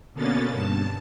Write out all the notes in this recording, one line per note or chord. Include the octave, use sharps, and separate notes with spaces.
B2 D3 A#3 B3 C#4 A6
G2 A5